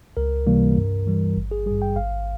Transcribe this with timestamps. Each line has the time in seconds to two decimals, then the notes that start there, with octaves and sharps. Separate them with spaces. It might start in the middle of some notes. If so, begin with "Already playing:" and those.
0.17 C#2 A#4
0.47 C3 E3 G3 A#3
0.77 G2
1.07 E3 G3
1.36 G#1
1.51 G#4
1.66 G2 G3 G#4
1.82 G5
1.96 G#1 F5